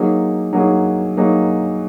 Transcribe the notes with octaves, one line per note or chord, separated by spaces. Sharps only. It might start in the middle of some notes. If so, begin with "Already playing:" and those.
Already playing: F#3 A#3 D#4 G#4
F#3 A#3 D#4 G#4
F#3 A#3 D#4 G#4